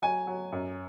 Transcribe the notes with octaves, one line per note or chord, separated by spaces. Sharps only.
F#3 G#5
F#3
F#2